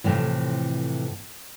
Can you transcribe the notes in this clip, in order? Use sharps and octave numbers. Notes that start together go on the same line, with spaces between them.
F2 A2 C3 E3